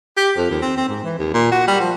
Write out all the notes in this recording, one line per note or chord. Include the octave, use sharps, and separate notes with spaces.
G4
F2
D#2
C4
C4
G#2
E3
D#2
A#2
F#4
G3
F3